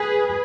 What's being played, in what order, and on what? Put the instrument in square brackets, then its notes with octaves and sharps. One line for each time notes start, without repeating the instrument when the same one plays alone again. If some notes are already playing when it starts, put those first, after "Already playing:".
Already playing: [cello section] G#4 B4